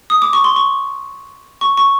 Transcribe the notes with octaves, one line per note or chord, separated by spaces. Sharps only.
D#6
D6
C#6
C6
C#6
C#6
C#6